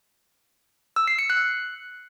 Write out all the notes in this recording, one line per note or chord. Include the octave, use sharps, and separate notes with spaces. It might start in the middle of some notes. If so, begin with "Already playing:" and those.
E6
C7
C#7
F#6